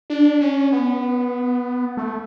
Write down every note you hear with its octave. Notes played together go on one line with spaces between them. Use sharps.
D4
C#4
B3
A3